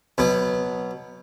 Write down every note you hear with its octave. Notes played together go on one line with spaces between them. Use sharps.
B2 F#3